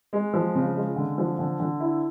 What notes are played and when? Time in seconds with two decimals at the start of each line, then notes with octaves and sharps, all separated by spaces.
0.13 G#3
0.33 F3
0.55 C#3
0.76 G#3
0.96 D3
1.18 F3
1.39 D3
1.60 D3
1.80 E4